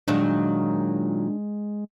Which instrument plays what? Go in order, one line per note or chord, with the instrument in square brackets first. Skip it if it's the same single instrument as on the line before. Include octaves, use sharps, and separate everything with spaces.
[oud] A#2 D#3 F#3 [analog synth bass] G#3 [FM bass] D4